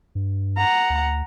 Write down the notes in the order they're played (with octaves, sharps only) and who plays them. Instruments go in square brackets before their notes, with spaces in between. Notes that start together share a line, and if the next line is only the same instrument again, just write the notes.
[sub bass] G2
[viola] F#5 A#5
[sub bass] D2